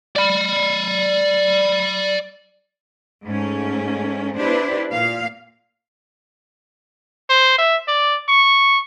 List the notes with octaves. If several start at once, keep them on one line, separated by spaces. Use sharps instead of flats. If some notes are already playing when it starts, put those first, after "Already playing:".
D5 B5
G#2 A3 C#4
B3 D4 E4 G4 B4 C5
A#2 F5
C5
E5
D5
C#6